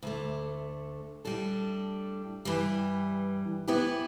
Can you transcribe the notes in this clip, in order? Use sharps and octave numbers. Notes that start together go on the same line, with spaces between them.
D2 D3 A3
A2 G3 D4 A4
G2 E3 G3
E3 B3 E4 G4